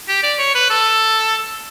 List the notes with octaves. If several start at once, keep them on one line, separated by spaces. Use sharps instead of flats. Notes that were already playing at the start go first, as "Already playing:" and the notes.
G4
D5
C#5
B4
A4